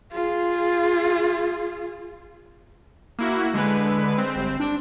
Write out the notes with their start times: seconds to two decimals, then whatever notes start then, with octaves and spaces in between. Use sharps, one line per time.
0.12 F4 G#4
3.19 A#3 E4 F#4
3.54 D3 G#3 B4
4.18 C4
4.36 G1
4.60 D4